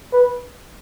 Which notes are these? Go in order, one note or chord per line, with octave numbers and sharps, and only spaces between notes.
B4